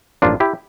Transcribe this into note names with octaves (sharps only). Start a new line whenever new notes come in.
A1 G2 F3 A#3 D4 F4
E4 G4